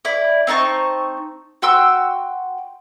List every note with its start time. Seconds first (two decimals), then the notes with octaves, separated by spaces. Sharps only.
0.05 E4 D5
0.47 C4 D#4 A5 C#6
1.62 F#4 G5 C6 E6